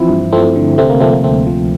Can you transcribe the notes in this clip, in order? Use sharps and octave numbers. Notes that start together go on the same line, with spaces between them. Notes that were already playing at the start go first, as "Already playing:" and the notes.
Already playing: E3 F3 C4 E4
G2
F3 A3 C4
D3
C3 A3 C4
A#3
F3 A3 C4
A#3
D2 A3 C4
F3